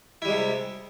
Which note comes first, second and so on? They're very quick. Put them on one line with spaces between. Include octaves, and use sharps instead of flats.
E4 G3 G#3 C3